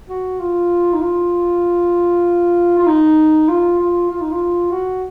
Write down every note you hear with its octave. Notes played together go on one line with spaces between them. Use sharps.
F#4
F4
D#4
F4
F4
D#4
F4
F4
F4
D#4
F4
F#4